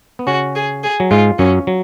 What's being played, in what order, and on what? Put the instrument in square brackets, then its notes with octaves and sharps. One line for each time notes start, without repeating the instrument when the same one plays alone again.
[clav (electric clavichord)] B3
[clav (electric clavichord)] C#3 C#4 [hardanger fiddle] F#4
[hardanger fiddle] G#4
G#4
[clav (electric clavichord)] F#3
[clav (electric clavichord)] G#2 G#3 [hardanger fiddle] F4
[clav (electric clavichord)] F#2 F#3 [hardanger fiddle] C#4
[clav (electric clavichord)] F#3